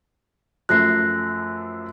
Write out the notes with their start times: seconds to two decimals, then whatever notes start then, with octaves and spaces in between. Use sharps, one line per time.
0.69 F#2 F3 A3 F#6 A#6 C7